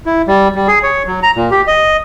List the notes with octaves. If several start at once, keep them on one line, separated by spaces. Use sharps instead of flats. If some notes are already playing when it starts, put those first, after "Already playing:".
E4
G3
G3
G#4
C#5
F#3
A#5
A#2
G4
D#5